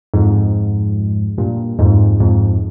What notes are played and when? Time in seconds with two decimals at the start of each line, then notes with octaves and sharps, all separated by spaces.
0.14 F2 G#2
1.38 G2 A#2
1.79 F2 G#2
2.20 F2 G#2